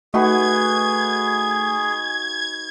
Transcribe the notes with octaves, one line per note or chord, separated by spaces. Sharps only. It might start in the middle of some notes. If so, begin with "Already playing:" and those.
A3 D#4 F#4 G#4 B4 G#6